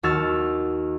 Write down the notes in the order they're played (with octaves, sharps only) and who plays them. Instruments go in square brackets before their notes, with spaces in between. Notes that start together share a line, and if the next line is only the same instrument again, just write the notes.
[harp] D#2 F#4 E6 F6 A6